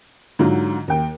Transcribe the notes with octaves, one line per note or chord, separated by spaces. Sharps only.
G#2 D3 F#3 F4
D#2 G5